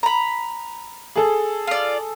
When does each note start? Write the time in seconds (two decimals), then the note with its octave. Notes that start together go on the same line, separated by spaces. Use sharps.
0.03 A#5 B5
1.16 G#4 A4
1.67 F4 D5